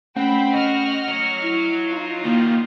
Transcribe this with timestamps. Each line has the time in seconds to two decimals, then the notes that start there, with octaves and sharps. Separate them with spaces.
0.16 A3 C4 C#4 F#5 G5 B5
0.54 F#4 D#5 F6
1.08 F#3 C#5 C#7
1.42 E4
1.88 D#4 F4 C7
2.24 D#3 G3 A#3